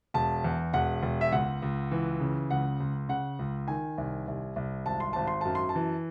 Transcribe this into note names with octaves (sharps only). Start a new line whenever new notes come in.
E1 A5
E2
E1 F#5
E1
E5
C#2 F#5
C#2
E3
C#3
C#2 F#5
C#2
C#3 F#5
C#2
D#3 G#5
C2
C2
C2
G#1 A5
C6
G#1 A5
C6
F#2 A5
C6
A5
E3